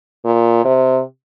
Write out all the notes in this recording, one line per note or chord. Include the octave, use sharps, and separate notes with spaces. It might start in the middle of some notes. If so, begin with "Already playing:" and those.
A#2
C3